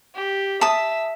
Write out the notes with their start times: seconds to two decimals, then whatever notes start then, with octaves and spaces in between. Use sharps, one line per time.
0.15 G4
0.61 E5 A5 D#6